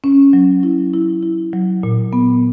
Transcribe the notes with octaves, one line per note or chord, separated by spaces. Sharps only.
C#4
F#3
E4
E4
E4
F#3
A#2
B3